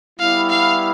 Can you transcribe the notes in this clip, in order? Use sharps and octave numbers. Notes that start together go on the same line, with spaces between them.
G3 B3 E4 F5
F5